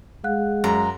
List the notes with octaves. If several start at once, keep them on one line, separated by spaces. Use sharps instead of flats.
G#3 F5 F#5 F#6
F#2 A#5